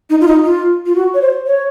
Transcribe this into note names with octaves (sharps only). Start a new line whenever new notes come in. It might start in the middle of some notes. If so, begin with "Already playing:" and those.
D#4
F4
D#4
F4
F4
F#4
C#5
C5
C#5